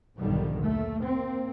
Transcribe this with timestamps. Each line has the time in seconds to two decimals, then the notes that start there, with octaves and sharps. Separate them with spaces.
0.18 B1 F2 G#2 D3 D#3 G3
0.58 D#2 A3
1.03 A#3 C4